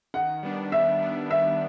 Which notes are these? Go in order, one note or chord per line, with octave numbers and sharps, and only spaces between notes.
D#3 F#5
G3 B3 D4
D#3 E5
G3 B3 D4
D#3 E5